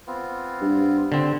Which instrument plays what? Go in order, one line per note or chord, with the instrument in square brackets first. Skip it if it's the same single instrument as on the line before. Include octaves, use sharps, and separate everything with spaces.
[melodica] B3 C4 F4
[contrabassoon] G2
[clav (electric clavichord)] D3 C4